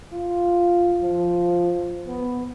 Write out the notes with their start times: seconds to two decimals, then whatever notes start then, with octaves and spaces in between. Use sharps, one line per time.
0.13 F4
1.01 F3
2.08 B3